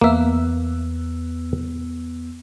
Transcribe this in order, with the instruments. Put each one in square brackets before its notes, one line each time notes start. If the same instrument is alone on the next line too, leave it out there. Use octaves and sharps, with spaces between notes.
[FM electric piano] E2 B3 E6 [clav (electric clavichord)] A#3 E5